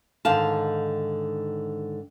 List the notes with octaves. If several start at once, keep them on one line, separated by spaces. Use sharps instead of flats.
G#2 D3 D#3 F5 A5